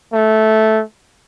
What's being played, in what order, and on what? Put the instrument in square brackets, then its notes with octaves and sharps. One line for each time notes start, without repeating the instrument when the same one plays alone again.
[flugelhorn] A3